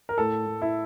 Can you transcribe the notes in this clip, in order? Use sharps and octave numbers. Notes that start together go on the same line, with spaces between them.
A#4
A2 A4
A2
E4